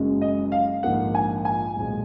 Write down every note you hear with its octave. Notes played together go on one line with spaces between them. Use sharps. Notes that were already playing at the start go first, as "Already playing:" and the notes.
Already playing: F#1 F#2 C#3 G#3
D#5
F5
A#1 G#2 F3 A#3 F#5
G#5
G#5
B1 A#2 F3 G#3